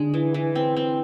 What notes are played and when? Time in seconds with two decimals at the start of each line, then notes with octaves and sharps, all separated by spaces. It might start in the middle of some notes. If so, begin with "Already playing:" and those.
Already playing: D3 G#3 D4
0.14 E3
0.34 E3
0.55 C4
0.77 C4